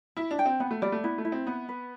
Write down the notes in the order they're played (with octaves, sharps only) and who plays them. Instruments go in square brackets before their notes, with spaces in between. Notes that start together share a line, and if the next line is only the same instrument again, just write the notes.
[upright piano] E4 [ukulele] E5
[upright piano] D4
[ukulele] G5
[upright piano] C4
[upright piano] B3 [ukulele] F#5
[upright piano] A3
[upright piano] G3 [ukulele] D5
[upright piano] A3
[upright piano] B3 [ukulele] E4
[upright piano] A3
[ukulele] E4
[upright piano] C4
[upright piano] B3 [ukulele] F#5
[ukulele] B4